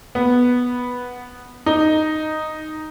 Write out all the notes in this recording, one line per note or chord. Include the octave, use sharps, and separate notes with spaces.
B3
D#4